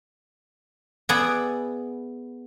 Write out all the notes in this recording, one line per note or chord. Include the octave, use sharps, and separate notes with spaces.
B3 G#4 B4 D5 E5 F#5